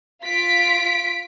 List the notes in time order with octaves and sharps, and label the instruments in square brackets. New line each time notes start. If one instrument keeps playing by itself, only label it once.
[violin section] F4 B6 D7